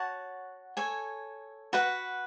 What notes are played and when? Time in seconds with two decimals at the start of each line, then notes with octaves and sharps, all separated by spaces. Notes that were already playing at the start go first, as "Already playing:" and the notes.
Already playing: F#4 C#5 F#5 A5
0.77 A4 C#5 G#5
1.73 F#4 B4 F#5